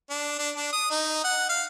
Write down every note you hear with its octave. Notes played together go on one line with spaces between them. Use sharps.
D4
D4
D4
D#6
D#4
F#5
F5